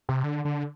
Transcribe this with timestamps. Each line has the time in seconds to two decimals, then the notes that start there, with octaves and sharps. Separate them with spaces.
0.09 C3
0.24 D3
0.45 D3